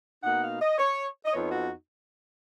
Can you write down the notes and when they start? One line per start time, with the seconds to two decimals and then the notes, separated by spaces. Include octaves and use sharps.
0.23 B2 A#3 D#4 F#5
0.42 F5
0.60 D#5
0.78 C#5
1.25 D#5
1.32 F2 F3 B3 D#4 C#5
1.51 F#4